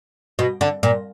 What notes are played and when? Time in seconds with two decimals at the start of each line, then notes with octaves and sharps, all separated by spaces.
0.39 B2
0.61 D3
0.83 A#2